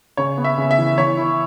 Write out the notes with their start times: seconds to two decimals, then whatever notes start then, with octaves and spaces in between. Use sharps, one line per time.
0.17 C#3 C#5
0.37 B3
0.44 E5
0.58 C#3
0.71 E5
0.78 E3
0.98 E3 C#5
1.17 E4